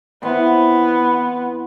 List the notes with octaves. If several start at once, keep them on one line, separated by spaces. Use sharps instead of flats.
E3 B3 C4 E4